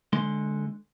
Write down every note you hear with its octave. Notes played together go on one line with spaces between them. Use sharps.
D3 G#3 C6